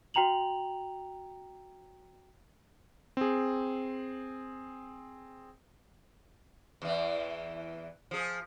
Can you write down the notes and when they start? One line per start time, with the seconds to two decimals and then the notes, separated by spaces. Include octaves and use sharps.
0.14 F#4 G5 A#5 F7 F#7
3.17 C4 G#4
6.82 E2 E3
8.11 F3 G#4